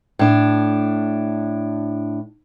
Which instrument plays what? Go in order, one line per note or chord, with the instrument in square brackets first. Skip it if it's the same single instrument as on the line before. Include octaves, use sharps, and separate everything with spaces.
[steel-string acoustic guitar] A2 D4